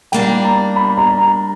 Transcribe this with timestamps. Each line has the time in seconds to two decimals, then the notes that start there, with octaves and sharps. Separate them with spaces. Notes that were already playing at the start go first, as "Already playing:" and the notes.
0.12 G3 A#3 D4 G5
0.44 A#5
0.76 B5
0.97 A#5
1.18 A#5